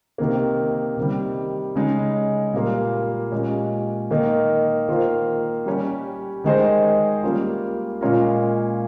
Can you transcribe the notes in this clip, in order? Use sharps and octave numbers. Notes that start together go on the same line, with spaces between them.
C3 D#3 A#3
C3 D#3 G3
C#3 G#3 D#4
A#2 G3 A#3 F4
A#2 G#3 C#4 G4
D#3 A#3 D#4
D#3 A#3 F4 C5
G3 C#4 G4
D#3 G#3 D#4 G#4 C5
G3 A#3 C#4 F4
A#2 G#3 C#4 F4 A#4